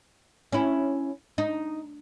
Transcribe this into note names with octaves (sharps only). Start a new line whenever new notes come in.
C#4 E4
D#4